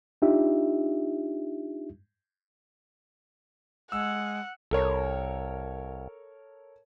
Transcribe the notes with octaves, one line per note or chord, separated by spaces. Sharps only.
D4 D#4 F4 G4 E5
G#3 F#5 E6
C2 A4 A#4 C#5